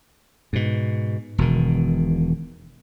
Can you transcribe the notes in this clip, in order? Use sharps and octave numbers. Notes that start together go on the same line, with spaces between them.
G#2 B2
E1 B2 D#3